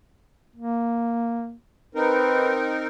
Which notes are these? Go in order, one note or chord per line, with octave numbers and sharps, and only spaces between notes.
A#3
C4 D#4 A#4 B4